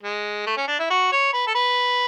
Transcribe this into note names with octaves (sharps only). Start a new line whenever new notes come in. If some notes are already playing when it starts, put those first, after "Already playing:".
G#3
A3
C#4
D4
E4
F#4
C#5
B4
A4
B4